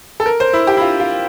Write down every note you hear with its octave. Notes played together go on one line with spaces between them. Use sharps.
A4
A#4
C5
E4
G4
E4
F4
F4